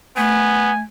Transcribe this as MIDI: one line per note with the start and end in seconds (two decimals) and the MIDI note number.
0.17 0.81 57
0.17 0.71 59
0.17 0.79 80